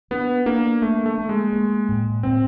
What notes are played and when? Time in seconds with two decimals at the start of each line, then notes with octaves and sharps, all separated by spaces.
0.11 B3 D4
0.46 A#3 D4
0.82 A3 A#3
1.06 A3
1.18 A#3
1.29 G#3
1.53 A#3
1.88 A2
2.23 A2 C4